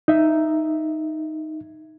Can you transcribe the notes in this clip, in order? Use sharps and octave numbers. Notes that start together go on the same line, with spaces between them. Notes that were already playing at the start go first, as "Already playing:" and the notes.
D#4 E5